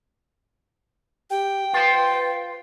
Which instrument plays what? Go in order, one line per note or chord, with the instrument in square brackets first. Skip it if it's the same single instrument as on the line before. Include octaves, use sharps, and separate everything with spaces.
[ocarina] G4 [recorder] G5
[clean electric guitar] F4 C5 [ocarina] B4